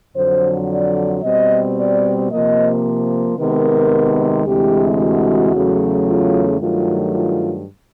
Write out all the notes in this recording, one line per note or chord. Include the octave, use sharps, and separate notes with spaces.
F2 D3 F#3 C5
D5
B2 G3 C4 D#5
D5
C3 F3 A#3 D#5
C3 D#3 G#3 B3 A#4
D2 C3 E3 G#3 G4
F#4
E2 C#3 F#3 A3
F4
G2 D#3 F#3 A3 F4
F4